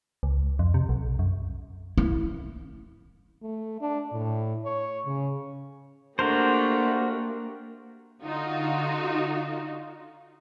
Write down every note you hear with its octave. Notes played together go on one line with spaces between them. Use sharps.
C#2
F2
C3
B1
F#2
E4
A3
D4
A2
C#5
C#3
A3 A#3 D4 F#4 G4 A#4 C5
D3 D#4 F4 F#4